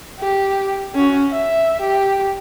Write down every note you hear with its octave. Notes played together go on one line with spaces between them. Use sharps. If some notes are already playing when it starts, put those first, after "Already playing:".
G4
C#4 F#4
E5
G4